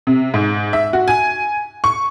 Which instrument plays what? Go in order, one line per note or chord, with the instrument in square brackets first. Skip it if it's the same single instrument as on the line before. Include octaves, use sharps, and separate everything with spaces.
[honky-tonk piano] C3
G#2
E5
F#4
G#5
C#6